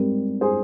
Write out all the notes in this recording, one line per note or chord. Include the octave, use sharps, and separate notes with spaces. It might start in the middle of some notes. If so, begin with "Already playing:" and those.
Already playing: G#2 G3 C4 A#4
G#4 C5